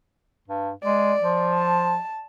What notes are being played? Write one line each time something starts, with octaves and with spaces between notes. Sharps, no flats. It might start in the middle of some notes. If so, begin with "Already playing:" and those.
G2
G#3 D5
F3
A5